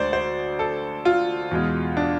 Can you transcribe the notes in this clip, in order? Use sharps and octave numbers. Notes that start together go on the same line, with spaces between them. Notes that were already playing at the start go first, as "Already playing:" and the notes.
Already playing: D2 D3 G#3 C5 D5
C5
A4
F4
E2 B2 G#3
D4